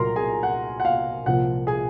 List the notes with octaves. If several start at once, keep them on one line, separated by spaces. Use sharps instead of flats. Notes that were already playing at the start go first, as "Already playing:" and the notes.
Already playing: C2 A#2 F#3 A#4 A#5 C6
G#4 G#5
F#5
F#5
F5
C2 A#2 F3 F#5
G#4 G#5